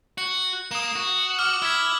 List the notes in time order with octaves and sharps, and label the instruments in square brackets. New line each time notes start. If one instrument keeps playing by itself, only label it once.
[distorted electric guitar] F#4 [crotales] C#7
[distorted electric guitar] A#3 [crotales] D#6 E7
[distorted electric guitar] F#4
[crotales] D6 F6
[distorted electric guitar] E4 [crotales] E6 G#6 B6